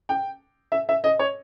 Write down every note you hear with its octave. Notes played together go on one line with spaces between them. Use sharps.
G5
E5
E5
D#5
C#5